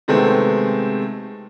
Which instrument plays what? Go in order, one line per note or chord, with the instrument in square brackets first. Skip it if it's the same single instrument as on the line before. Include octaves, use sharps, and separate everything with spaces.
[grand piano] C3 D#3 G#3 A3 B3 C4